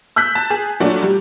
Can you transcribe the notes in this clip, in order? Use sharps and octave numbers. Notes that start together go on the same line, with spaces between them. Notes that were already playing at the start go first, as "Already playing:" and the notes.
E6 F#6 G6 B6
A5
G#4
A#2 F#3 A3 D4 F#4
G3